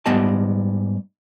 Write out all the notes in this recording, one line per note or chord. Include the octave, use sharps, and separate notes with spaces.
G#2 G3 B3 D5 D#5 A5